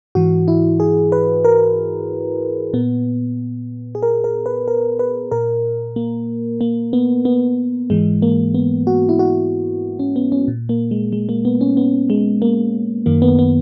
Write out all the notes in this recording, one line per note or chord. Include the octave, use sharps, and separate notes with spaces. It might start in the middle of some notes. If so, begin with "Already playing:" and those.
G#2 E3 F#4
E4
G#4
B4
A#4
A#2 B3
G#4
A#4
A#4
B4
A#4
B4
A#2 A#4
A#3
A#3
B3
B3
G#2 E3 G#3
A#3
B3
F#4
E4
F#4
C#4
B3
C#4
A#2
A#3
G#3
G#3
A#3
B3
C#4
B3
G#3
A#3
F#2 D#3 A#3
B3
B3